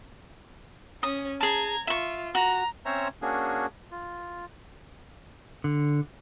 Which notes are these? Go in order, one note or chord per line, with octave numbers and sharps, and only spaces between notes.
C#4 D#6
G#4 A5 A#5 G#6
F4 E5 C#6
F#4 A#5
C4 C#4 C5 C#5 E5 A#5
A#3 C#4 D4 F#4 G#4
F4
D3